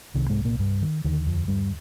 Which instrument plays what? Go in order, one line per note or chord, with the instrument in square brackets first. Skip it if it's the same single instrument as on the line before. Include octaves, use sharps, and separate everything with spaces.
[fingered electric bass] C2 C3 D#3
G#2 G#3
A#2 A#3
G2 G3
D#3
D#2 D3 D#3
F2 F3
G2 G3